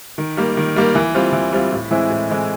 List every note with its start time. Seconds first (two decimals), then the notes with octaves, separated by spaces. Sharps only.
0.18 D#3
0.37 G3 A#3
0.57 D#3
0.76 G3 A#3
0.95 E3
1.15 G3 C4 F4
1.33 E3
1.52 G3 C4 F4
1.72 A2
1.91 E3 G#3 C4 E4
2.10 A2
2.29 E3 G#3 C4 E4